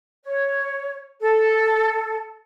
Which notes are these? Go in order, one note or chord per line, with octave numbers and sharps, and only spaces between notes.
C#5
A4